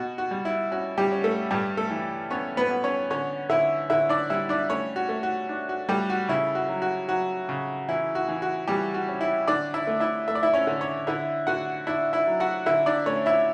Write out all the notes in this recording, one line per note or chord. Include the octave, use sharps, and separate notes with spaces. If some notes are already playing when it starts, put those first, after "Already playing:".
Already playing: B2 F#4
F#4
G3
E4
C#4 F#4
G3 G4
C#4
A3 A4
G2 G3 G4
A3 A4
E3
B3 C#4 C#5
B3 B4
B3
C#4 C#5
D3 C#4 C#5
D3 E4 E5
D3 E4 E5
D4 D5
G3 E4 E5
D4 D5
A3 C#4 C#5
F#4
A3
F#4
D4
F#4
G3 A3 G4
F#4
C#3 E4
F#4
F#3
F#4
F#3 F#4
C#3
E3 E4
F#4
E3
F#4
E3 G3 G4
F#4
C#4
E4
D3 D4 D5
E4 E5
A3
E4 E5
A3 E5
D5
E4 E5
C#4 C#5
D3
C#4 C#5
D3 E4 E5
D3 F#4 F#5
D4 E4 E5
E4 E5
F#3
F#4 F#5
D3 E4 E5
D4 D5
A3 C#4 C#5
E4 E5